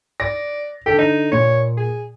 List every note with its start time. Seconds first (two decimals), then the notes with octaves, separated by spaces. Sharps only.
0.20 D5 A#6
0.86 D3 G4 A4
0.98 D3 D#4
1.32 A#2 A#3 C#5
1.77 G#4